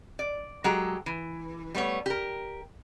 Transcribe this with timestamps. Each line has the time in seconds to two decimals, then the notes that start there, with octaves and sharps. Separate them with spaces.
0.19 D5
0.64 F#3 G#3 G4 A4 A#5
1.06 E3
1.75 G3 A3 B3 C#5
2.06 G4 A#4